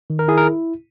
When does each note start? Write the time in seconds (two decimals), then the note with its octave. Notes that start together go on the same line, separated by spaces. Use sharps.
0.10 D#3
0.19 A#4
0.28 E4 G#4
0.37 A#4